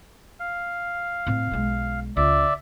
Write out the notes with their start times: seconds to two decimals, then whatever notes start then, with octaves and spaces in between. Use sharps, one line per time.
0.40 F5
1.27 A2 C4
1.51 B1 G#3
2.17 C#2 D5 E5